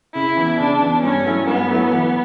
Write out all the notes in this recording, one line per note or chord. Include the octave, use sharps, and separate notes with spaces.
C#3 E4
E3 B3
C#3 D4
E3 B3
G2 C#4
F#3 A3 E4
G2 B3
F#3 A3 E4
E3